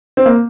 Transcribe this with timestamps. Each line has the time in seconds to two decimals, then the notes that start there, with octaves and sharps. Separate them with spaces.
0.17 C4
0.26 A#3